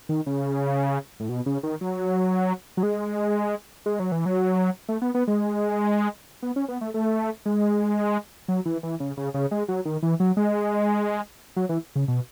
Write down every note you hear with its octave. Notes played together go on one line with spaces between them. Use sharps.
D#3
C#3
A2
B2
C#3
D#3
F#3
F#3
G#3
G#3
F#3
E3
F#3
A3
B3
B3
G#3
B3
C#4
B3
A3
A3
G#3
F#3
E3
E3
C#3
C#3
C#3
G#3
F#3
D#3
E3
F#3
G#3
F#3
E3
C#3
B2